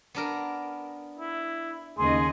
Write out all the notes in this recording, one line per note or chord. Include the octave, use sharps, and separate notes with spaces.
B3 D4 A#4
E4
D#2 C#3 G#4 D#5 C6